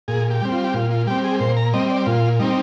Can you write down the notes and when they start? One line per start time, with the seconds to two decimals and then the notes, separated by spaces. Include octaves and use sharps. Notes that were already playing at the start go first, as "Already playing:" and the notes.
0.08 A#2 G#4
0.30 G4
0.41 G3 C4
0.52 F4
0.64 G4
0.74 A#2 F4
0.91 F4
1.07 G3 C4 G4
1.24 G#4
1.40 A#2 C5
1.57 A#5
1.73 G3 C4 D#5
1.90 D5
2.06 A#2 F4
2.39 G3 C4 D#4